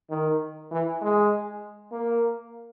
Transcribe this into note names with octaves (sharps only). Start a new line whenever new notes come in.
D#3
E3
G#3
A#3